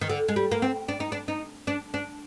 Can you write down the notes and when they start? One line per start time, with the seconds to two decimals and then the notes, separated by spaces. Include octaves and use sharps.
0.01 D#3
0.10 D3
0.28 G#3
0.36 G3
0.51 A#3
0.62 C4
0.88 D4
1.00 D#4
1.12 D4
1.28 D#4
1.67 D4
1.94 D4